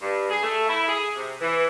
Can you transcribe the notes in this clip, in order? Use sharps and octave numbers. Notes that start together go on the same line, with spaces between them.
G2
G#4
A3
E4
G#4
C3
E3